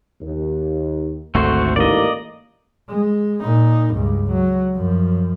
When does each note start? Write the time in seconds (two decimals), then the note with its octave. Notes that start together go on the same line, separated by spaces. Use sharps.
0.21 D#2
1.35 G#1 D2 A3 F#4 C5
1.76 A1 G#2 A#3 D5 D#5
2.90 G#3
3.42 A#2 D#4
3.94 C#2 G2
4.31 F#3
4.75 F#2 F3